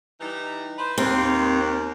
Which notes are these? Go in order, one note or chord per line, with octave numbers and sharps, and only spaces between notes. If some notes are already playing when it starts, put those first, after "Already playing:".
E3 G3 D#4
B4 C5
D#2 C4